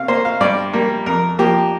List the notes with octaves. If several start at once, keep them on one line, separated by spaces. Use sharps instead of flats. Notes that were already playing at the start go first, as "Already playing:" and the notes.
Already playing: C3 F5
A#3 C5
F5
G2 D5
G3 A#3
F2 A#4
F3 A#3 G4